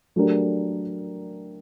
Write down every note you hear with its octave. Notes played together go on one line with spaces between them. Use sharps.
F#3 A3 D4 G4 A#4